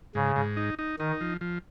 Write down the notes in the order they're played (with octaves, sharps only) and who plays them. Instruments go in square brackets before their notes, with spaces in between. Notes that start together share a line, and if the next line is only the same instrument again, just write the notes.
[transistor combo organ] G#2 [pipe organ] C#3
[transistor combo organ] G#2
D#4
D#4
[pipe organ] D#3 [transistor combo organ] D#4
[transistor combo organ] F3
F3